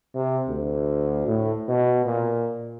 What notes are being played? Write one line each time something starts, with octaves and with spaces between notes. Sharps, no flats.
C3
D2
A2
B2
A#2